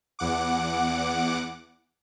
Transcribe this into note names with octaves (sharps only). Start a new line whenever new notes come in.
E2 F#5 D6